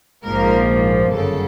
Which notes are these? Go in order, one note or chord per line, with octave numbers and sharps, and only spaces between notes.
A#1 G#2 F3 A#3 A#4
G1 F#2 C#3 A4